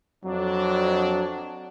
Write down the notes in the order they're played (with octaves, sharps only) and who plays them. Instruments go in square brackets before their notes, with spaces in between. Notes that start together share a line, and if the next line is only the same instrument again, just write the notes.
[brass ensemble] F2 D4 [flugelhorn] F#3